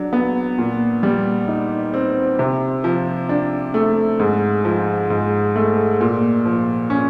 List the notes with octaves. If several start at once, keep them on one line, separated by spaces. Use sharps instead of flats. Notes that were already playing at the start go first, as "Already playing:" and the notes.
Already playing: F#3 D4
B3
A#2
G3
D#4
C4
C3
F3
D4
A3
G#2
F3
G#2
A3
A#2
F3
C#4